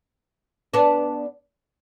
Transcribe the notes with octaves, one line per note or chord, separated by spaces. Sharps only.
B3 D4